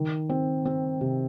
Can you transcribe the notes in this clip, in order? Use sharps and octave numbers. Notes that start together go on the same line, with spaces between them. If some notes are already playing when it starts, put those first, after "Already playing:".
Already playing: D#3
C4
C4
C3